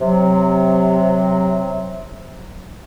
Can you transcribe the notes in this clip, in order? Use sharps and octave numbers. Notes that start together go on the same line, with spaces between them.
C3 F#3